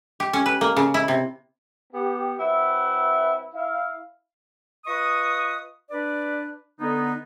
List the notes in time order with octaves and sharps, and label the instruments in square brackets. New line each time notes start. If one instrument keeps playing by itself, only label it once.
[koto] G4
C#4
B4
A#3
C#3
E4
C3
[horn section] B3 G4
F#3 C4 E4 B4 E5 F#5
E4 F5
[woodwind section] F4 B4 D#5 C#6 D#6
D4 B4 D5
D3 B3 D#4